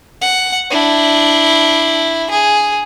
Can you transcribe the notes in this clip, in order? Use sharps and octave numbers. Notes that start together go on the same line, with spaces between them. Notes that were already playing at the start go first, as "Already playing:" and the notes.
F#5
D4 E4
G#4